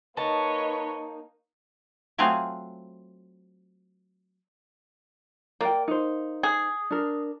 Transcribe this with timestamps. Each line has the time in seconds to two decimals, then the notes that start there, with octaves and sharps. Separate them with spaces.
0.17 A#3 D#4 B4 C#5 D#5 A5
2.18 F#3 A3 C4 F4 G#4 F5
5.61 A#3 D5 G5
5.88 D#4 C5
6.43 G#4
6.90 D4 A#4